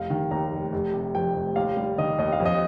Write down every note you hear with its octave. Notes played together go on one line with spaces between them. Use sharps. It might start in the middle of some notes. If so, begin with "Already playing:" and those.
Already playing: F1 F5
D#3
D#2 A#5
F1
F1
C3
F2 G5
F1
D#2 F5
G3
D#3 D#5
D#2 D#5
F5
F2
D#5